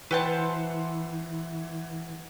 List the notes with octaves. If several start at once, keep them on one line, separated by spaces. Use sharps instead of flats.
E3 B4 C5 E5 F#5 G5 A5